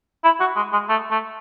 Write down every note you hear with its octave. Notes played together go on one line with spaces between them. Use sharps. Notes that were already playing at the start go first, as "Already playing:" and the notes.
E4
F#4
G#3
G#3
A3
A3